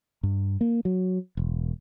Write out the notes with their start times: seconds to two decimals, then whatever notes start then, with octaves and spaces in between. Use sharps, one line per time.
0.23 G2
0.61 A#3
0.85 F#3
1.37 E1